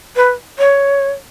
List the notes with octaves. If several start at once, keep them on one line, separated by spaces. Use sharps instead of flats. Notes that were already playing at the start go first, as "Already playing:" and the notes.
B4
C#5